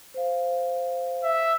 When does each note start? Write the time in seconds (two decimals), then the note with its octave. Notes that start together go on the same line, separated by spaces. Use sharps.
0.14 C5 F5
1.24 E5